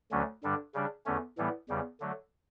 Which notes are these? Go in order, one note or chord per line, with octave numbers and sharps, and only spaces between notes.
D2 D3 F#3 A3 C#4
G2 D3 G3 D4
C#3 G3 D4
E2 D3 A3 C#4
A2 E3 G3 B3
E2 C#3 G3
D3 F#3 A3